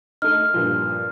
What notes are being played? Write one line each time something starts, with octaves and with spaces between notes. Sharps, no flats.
A3 D#4 F6
G2 A#2 F3